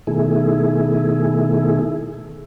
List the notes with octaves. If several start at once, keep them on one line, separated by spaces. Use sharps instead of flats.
B2 D#3 A3 E4 G#4